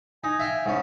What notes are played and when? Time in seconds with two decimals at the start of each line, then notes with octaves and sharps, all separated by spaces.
0.24 D#4 G#5
0.39 E5 F5 G5
0.66 G#2 C#4